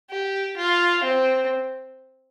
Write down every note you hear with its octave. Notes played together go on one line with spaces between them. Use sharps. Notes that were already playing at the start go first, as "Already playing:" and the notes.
G4
F4
C4